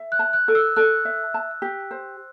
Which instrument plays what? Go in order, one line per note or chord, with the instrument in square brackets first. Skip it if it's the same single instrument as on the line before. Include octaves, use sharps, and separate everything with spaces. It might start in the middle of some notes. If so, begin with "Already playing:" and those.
Already playing: [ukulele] E5
[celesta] F#6
[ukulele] A5
[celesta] F#6
[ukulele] A4
[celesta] E6
[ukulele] A4 [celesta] F#6
[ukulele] E5
A5
G4
C5